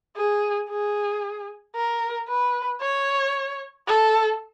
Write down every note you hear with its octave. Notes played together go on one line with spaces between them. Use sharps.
G#4
G#4
A#4
B4
C#5
A4